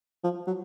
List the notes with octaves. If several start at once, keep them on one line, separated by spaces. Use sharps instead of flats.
F3
F#3